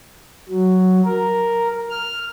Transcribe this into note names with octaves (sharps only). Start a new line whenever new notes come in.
F#3
A#4
F6